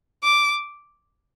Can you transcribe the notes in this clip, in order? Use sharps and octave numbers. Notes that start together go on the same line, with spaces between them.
D6